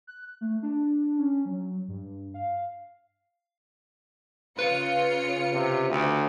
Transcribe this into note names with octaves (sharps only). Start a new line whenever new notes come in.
F#6
A3
D4
C#4
F#3
G2
F5
C#3 F4 B4 C#7
C3
D2